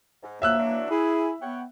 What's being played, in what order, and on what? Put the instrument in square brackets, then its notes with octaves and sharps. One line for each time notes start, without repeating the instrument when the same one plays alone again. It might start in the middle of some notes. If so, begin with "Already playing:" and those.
[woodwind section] G#2
[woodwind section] D3 F3 F#3 [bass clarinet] A#3 [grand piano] E5 E6 F#6
[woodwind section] E3 F#3 D4
[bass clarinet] E4 [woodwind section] G#4
[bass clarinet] B3 [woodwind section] C#5 F#5 G5